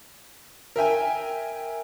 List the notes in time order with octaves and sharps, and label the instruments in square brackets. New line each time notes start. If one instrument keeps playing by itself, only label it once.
[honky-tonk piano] A#4 E5 G5 G#5